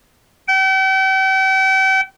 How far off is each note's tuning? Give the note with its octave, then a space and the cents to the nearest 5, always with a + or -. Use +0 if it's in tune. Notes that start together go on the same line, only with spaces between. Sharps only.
G5 -40